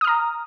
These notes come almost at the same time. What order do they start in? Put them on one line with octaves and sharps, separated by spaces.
D#6 F6 A#5